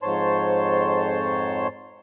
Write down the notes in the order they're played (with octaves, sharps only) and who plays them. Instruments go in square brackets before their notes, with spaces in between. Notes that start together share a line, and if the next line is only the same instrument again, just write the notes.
[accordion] F2 G#2 C5 C#5 A5 C6